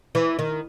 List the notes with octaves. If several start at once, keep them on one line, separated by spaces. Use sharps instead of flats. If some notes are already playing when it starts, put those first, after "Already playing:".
E3
D#3